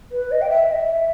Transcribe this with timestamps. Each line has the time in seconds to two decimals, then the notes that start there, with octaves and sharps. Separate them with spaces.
0.11 B4
0.31 D#5
0.41 G5
0.49 E5
0.71 D#5
0.77 E5